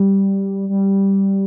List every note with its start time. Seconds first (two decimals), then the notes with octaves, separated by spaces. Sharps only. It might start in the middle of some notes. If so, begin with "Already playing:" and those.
Already playing: G3
0.69 G3